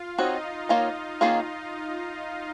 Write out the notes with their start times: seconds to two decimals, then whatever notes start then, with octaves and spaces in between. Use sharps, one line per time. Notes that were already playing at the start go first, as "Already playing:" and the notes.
Already playing: F4 F5
0.18 C4 D#4 F#4 C#5 D#5
0.69 D#3 A#3 F4 A#4 C#5
1.21 D#3 A#3 C#4 F4 G#4